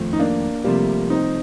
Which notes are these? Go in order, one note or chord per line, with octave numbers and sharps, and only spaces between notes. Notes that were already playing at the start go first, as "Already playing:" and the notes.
Already playing: F2 D#3 A3 C4 F4
D#4
A#3 D4
C2 C3 F3 G3 A3 A#3
C4 D#4